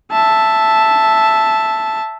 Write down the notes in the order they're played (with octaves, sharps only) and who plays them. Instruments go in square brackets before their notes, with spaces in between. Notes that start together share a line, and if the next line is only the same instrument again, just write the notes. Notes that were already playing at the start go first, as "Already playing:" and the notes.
[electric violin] E5 A5